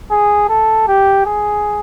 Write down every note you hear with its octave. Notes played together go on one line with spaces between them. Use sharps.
G#4
A4
G4
G#4